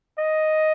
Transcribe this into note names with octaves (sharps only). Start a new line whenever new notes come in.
D#5